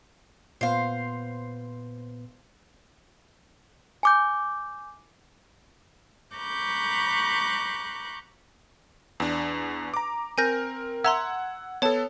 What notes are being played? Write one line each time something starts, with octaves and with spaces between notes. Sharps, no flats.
A#2 B3 B4 C5 F5
G#5 D6 G6
A#5 B5 C#6 D6 F#6 G6
E2 D4
A#5 D6
C4 A#4 G#5 G6 A#6
E5 F#5 A#5 C6 E6 G#6
B3 A4 C#5 A5